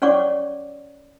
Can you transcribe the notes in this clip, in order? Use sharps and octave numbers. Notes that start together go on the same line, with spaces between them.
C#4 C#5 D5 F#5 C#6 D6